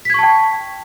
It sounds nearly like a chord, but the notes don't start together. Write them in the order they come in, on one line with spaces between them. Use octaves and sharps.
B6 G#6 C#6 A5 G5